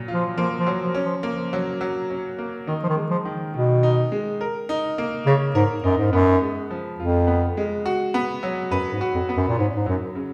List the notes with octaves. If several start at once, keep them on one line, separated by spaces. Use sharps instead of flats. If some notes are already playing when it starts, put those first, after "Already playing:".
Already playing: A#2 F#3
F4
F3
F3 A#3
F3
F#3
F3
C#4
F3
F3 A#3
F#3
F#3
C#4
A#3
D#3 D#4
F3
D#3
G#3
F3
D#3
B2 D#3
D#4
G#3
A#4
D#4
A#3
C#3 C#5
G#2 A#4
F#2 D#4
G#2
F#2 B3
G#3
F3
F2 F4
B3
G#3
F#4
B3
F#3
F#2 B4
G#2
F#4
F2
B3
F#2
A#2
G#2 C#4
G#2
F#2 F#3
C#3